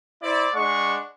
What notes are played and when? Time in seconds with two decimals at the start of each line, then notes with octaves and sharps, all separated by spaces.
0.22 E4 C5 D5
0.54 G#3 D4 F#5 C#6